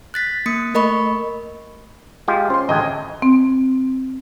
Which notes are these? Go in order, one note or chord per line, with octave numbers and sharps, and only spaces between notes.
F#6 A6 B6
A#3 D#6 C#7
A3 A#4 D#5 B5 C#6
G#3 F4 G4
C#4 C5 C6
A1 D2 G#4 D#5 G5
C4